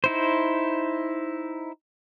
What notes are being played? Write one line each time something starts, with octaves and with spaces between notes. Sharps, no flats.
D#4 E4 C5